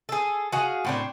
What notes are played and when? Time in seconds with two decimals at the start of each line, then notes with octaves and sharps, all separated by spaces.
0.09 G#4 A4
0.52 F#4 G#4 F5
0.85 A2 C4 D4